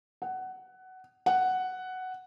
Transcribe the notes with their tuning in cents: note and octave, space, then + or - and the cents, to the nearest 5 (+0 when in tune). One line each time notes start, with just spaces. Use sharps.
F#5 +15
F#5 +5